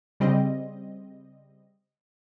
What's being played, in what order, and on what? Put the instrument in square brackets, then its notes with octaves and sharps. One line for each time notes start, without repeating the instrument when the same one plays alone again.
[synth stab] C#3 G3 C4 D#5